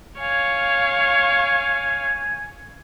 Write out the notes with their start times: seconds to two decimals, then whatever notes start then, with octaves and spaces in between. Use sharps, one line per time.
0.21 C#5 F5 G#5